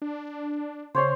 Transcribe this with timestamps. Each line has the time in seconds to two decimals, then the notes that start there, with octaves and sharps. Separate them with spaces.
0.02 D4
0.95 C#3 C5 C#5 C6